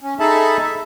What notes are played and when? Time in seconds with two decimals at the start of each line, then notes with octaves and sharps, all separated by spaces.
0.01 C#4
0.20 D#4 G#4 A4 E5 A5 B5
0.62 E5